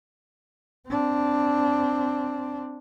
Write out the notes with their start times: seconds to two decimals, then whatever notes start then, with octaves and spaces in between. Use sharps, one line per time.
0.88 C4 D4